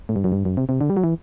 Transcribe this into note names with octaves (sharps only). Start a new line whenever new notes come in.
A2
G2
F#2
G2
F#2
C3
C3
D3
G3
F#3
E3